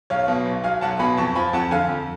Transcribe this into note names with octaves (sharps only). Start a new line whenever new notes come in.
B1 C#5 F5
B2
B1
F#3 F5 G#5
B1 F#5 A5
B2 G#5 B5
F2 A5 C#6
F3 G#5 B5
F2 F#5 A5
D3 F5 G#5
F2